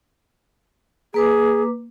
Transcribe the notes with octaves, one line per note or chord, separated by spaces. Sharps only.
A#3 G#4 B4 D6